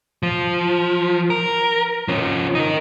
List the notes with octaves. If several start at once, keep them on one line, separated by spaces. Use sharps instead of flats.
F3
A#4
F3 C#4
D#4 A#4